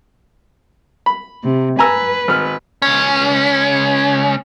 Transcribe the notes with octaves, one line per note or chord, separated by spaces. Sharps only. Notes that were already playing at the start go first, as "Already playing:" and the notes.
B5
C3
B4 G#5 A#5 E6
G#1 F6
C#2 C#4